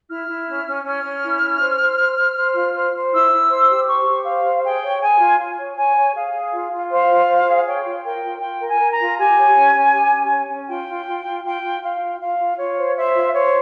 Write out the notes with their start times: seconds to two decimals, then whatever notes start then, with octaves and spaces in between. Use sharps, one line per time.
0.09 E4 F6
0.28 E4
0.47 C#4
0.66 C#4
0.85 C#4 F6
1.03 C#4
1.23 E4
1.42 C#4
1.61 C5
1.80 C5
1.98 C5
2.17 C5
2.36 C5
2.55 F4
2.74 C5
2.94 C5
3.12 E4 E6
3.31 E4
3.49 C5
3.69 G4
3.87 C5 C#6
4.07 G4
4.25 C5 F5
4.44 C5
4.63 G#4 G5
4.83 C#5
5.00 G#4 G#5
5.20 F4
5.39 F4
5.58 C#5
5.76 C#5 G#5
5.96 C#5
6.15 G#4 F5
6.33 G#4
6.53 F4
6.71 F4
6.90 C5 F5
7.10 F4
7.28 C5
7.47 G#4
7.66 C#5 G5
7.84 F4
8.04 A#4 G5
8.23 F4
8.41 F4 G5
8.61 A#4
8.67 G#5
8.80 A#4
8.91 A#5
8.99 F4
9.17 G4 G#5
9.37 C#5
9.55 C#4
9.74 C#4
9.92 G4
10.12 C#4
10.30 C#5
10.50 C#4
10.68 F4 G5
10.88 F4
11.06 F4
11.25 F4
11.44 F4 G5
11.63 F4
11.82 F4 F5
12.01 F4
12.20 F4 F5
12.39 F4
12.57 F4 C#5
12.77 C5
12.95 C5 E5
13.15 F4
13.33 C5 C#5